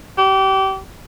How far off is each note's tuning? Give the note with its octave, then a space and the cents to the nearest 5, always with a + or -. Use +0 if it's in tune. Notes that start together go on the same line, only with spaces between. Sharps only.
G4 -30